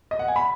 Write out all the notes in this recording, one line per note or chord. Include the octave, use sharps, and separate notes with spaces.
D#5
F#5
G#5
B5